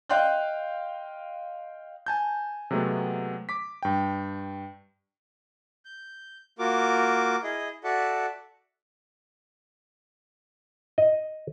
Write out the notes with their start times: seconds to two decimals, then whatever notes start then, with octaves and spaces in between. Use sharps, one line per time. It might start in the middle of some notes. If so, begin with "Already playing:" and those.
0.10 D#5 F5 G5 C6 F#6 G6
2.06 G#5 A5 G6
2.71 C3 F#3 G#3 A3 B3 C4
3.49 D6 B6
3.83 G2 G5
5.85 G6
6.59 A#3 F4 F#4 A#4 D6
7.43 E4 G#4 D#5
7.84 F#4 A4 D5 E5 F#5
10.98 D#5